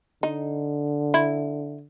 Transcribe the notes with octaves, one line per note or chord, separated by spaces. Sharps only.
D3 D#4
E4